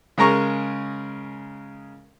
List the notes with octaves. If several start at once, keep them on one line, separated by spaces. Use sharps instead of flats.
C#3 G#3 A#4 A#5 C#6